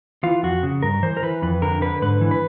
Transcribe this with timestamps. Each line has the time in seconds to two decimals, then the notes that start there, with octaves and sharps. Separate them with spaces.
0.23 E3 F4
0.43 F2 F#4
0.63 C#3
0.82 G2 A#4
1.03 E3 C5
1.17 A#4
1.23 E3 B4
1.42 F2 B4
1.62 D3 A#4
1.81 D3 B4
2.02 G#2 B4
2.21 E3
2.31 B4